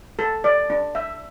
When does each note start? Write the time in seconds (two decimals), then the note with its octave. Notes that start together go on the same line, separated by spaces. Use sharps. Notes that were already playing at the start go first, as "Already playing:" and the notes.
0.19 A4
0.44 D5
0.70 D4
0.95 E5